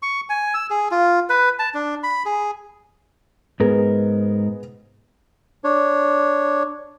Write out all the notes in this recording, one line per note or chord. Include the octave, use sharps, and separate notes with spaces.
C#6
G#5
E6
G#4
F4
B4
A5
D4
B5
G#4
G#2 B3 G#4 A#4
D4 C#5